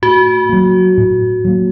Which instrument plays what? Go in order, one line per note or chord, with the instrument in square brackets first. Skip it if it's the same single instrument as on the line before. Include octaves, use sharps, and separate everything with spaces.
[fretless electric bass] A2 [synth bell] F#4
[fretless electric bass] F#3 A#3
A2
F#3 A#3